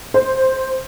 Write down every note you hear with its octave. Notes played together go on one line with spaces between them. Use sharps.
C5